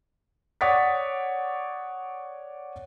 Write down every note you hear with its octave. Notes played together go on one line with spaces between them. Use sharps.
C#5 D5 F#5 D#6 A6 B6